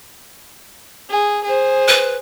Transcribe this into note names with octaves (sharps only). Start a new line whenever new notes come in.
G#4
G#4 C5
B4